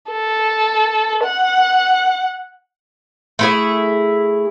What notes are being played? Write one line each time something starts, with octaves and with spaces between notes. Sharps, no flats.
A4
F#5
A3 E4 G#4